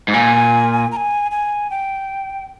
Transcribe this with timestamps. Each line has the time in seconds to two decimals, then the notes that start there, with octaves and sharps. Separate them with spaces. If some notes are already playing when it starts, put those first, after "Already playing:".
0.08 G#2
0.13 A#2 G#5
0.92 A#5
0.97 G#5
1.31 G#5
1.70 G5